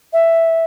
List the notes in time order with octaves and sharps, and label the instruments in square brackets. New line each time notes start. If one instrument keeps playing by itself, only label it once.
[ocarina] E5